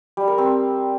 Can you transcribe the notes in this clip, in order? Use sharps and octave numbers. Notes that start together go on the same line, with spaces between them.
G3
A#4
C4